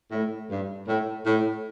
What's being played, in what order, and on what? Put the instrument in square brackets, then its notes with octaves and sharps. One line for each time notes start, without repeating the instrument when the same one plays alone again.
[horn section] A2
G2
A2
A2